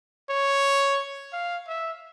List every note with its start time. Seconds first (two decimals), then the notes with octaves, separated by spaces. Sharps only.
0.29 C#5
1.33 F5
1.67 E5